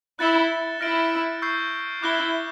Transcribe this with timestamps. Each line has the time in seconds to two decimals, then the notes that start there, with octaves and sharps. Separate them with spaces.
0.19 E4 F#6 A6 C#7 E7 G7
0.81 E4 F6 A#6 D7 G7
1.42 C#6 E6 G6 C7
2.02 E4 D6 F#6 A#6 D7 G7